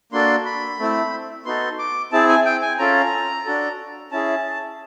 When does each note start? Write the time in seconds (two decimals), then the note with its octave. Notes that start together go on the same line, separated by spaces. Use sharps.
0.12 A#3 D4 F#4 A4 C6
0.46 B5
0.79 A3 C4 E4
1.46 B3 D#4 F#4 A4 C6
1.79 D6
2.12 C4 E4 G#4 A5
2.29 G#5
2.45 G5
2.62 G#5
2.79 C#4 F4 A4 A#5
3.46 D4 F#4 A4
4.12 C#4 E4 G#4 A5